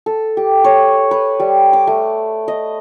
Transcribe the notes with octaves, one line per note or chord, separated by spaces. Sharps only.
A4
G4
C#5
B4
G3
D6
A3
D#5